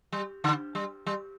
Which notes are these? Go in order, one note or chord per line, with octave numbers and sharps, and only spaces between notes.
G3
D3
G3
G3